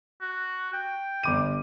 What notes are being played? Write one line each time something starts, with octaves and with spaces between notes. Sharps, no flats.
F#4
G5
G1 D6 D#7